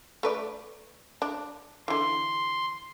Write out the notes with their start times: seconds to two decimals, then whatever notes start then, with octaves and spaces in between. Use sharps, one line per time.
0.23 A3 B4 D5
1.22 D4
1.88 D3 E3 C6